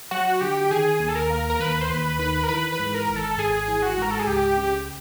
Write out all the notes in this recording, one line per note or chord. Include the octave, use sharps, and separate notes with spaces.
F#3 F#4
D3 G4
D#3 G#4
D#2
A4
A#4
A#3
A#4
D#2 B4
C5
D#2 B4
D#3 B4
A#4
E3 B4
B4
G#2
A#4
G#1
A4
G#1 G#4
E3
F#4
G#2 A#4
A4
G#4
C#2 G4
C#3